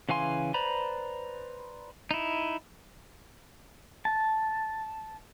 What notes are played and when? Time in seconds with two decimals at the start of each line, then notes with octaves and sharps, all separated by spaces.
0.09 C#3 E3 F5 G#5 C6
0.54 B4 C5 D5 A#5 B5
2.11 D#4 E4
4.05 A5